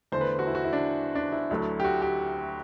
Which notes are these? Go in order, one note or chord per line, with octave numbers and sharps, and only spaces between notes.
E2 D3 A3 C5
B4
F#4
E4
F#4
E4
D4
D4
E4
D2 D3 F#3 A3
G4
F#4
G4